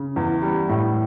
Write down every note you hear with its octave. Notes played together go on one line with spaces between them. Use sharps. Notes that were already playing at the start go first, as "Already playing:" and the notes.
Already playing: C#3
E2
G3
A2